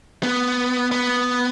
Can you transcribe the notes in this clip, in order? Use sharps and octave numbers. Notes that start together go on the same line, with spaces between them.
B3
B3